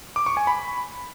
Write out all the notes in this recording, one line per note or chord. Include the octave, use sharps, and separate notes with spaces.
D6
C#6
G#5
B5